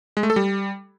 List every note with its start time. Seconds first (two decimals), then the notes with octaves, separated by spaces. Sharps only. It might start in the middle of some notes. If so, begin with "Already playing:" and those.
0.17 G#3
0.23 A3
0.30 A4
0.36 G3